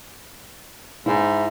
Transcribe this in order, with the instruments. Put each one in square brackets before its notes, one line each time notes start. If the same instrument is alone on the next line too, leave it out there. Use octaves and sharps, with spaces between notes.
[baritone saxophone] G#2 [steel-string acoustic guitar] E4